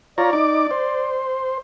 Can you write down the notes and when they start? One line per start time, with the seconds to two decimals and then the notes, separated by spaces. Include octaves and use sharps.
0.18 F4 C#5 D5 A#5
0.33 D#4 D6
0.71 C5